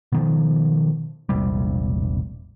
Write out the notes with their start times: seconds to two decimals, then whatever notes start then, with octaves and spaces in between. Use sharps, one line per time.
0.12 B2 D#3 F3
1.29 E1 A#1 C3 G3